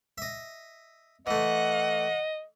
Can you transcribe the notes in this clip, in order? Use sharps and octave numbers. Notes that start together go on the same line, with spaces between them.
D#5 E5
E3 A3 D#5 F#5